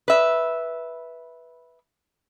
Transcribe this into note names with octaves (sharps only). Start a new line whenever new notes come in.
B4 E5